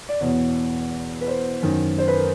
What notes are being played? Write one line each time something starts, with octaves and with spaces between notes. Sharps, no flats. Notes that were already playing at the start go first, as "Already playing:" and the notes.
D5
E2 B2 C#5
B4
C5
F#2 D#3
C5
B4
A#4